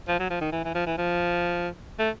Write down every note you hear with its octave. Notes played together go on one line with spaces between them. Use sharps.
F3
F#3
F3
D#3
E3
E3
F3
E3
F3
A3